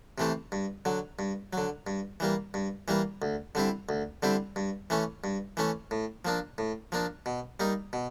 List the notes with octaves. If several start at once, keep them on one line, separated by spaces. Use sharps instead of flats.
C3 E3 A3 C4
G2
D3 F#3
G2
D3 F#3
G2
E3 G3 A#3
G2
E3 G3 A#3
D2
D3 G3 C4 E4
D2
D3 G3 C4 E4
G2
E3 A3 C#4
G2
E3 A3 C#4
A2
F3 A#3 D4
A2
F3 A#3 D4
B2
G3 A#3 D#4
B2